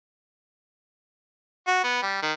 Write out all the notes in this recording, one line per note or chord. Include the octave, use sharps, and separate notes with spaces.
F#4
B3
G3
D#3